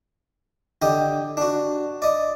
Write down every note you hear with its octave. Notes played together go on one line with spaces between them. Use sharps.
D3 G4 D#5
D4 F#4
D5 D#5